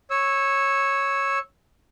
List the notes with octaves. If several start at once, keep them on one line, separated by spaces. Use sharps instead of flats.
C#5 E6